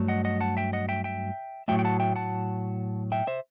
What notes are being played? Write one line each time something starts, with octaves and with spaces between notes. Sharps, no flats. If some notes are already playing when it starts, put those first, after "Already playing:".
Already playing: G2 F#3 A3
D#5 F#5
D#5 F#5
F#5 A5
E5 G5
D#5 F#5
E5 G5
E5 G5
A2 F#3 A3 E5 G5
G5
F#5 A5
E5 G5
F#5 A5
E5 G5
C5 E5